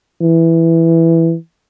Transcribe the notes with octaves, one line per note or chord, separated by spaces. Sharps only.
E3